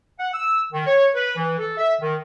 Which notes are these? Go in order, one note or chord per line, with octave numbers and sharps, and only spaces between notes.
F#5
E6
D#3
C#5
B4
E3
A4
E5
D#3